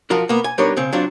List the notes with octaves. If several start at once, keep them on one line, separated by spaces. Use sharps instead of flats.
F3 F4 F#4 A#4
A#3 B3
G#5
G3 B3 D4 D#4 A#4 C#5
C#3 C4
F#3 C4 D4 F4